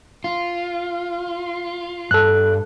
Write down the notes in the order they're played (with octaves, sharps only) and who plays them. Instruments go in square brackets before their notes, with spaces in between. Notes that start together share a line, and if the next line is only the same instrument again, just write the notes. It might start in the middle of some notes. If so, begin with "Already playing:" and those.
[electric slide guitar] F4
[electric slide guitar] G2 [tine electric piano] A4 F#6